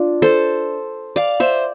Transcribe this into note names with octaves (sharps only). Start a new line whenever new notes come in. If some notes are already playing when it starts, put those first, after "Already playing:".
Already playing: D4 F4
A4 C5
D5 F5
C5 E5